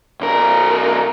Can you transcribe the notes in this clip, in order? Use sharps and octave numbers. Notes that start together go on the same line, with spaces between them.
B1 A#4